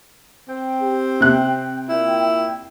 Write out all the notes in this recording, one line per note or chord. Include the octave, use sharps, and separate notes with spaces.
C4 G5
G4
C3 F#6
A#2 E4